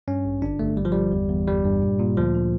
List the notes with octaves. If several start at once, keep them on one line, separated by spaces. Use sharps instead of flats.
G2 C#4
A1
G1 D4
G1 A3
G1 G3
F3
G1 G3
E2
E2
G1 G3
G2
A#2
A#2
D2 F3
D3